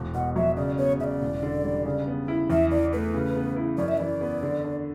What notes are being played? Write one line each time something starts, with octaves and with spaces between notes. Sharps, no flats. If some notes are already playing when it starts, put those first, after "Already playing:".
Already playing: E1
B2 F#5
F#3 E5
C#3 D5
B3 C#5
C#3 D5 E5
E1
D3
G3
C#3
B3
E4
E2 E5
E3 D5
A3 B4
C#3
B3
E4
F#2 D5
E5
E3 D5
B3
D3
D4